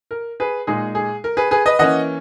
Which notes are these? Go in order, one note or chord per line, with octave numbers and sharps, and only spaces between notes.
A#4
G#4 B4
A#2 G#3 D#4 G#4
G#4
A#4
G#4 B4
G#4 B4
B4 D#5
E3 A#3 C#4 D#5 F#5